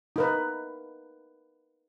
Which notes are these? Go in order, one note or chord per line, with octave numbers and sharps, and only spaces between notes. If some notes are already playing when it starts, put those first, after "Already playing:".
D#4 A#4 B4